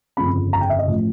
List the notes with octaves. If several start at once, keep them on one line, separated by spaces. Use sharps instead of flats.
G1 F2 C#3 B5
A#5
G5
E5
D#5
A1 F3